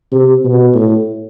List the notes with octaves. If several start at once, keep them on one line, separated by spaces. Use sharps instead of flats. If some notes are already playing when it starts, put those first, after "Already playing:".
C3
B2
A2